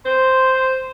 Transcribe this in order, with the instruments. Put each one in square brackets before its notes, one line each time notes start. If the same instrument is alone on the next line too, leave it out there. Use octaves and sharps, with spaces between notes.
[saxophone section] C5